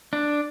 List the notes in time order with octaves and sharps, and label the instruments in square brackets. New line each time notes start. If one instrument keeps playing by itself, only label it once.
[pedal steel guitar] D4